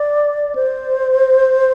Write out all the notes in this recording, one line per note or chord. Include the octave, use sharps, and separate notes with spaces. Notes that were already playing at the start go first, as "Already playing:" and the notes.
Already playing: D5
C5